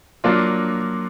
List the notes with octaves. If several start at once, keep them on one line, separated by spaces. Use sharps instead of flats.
F#3 A#3 D4 F4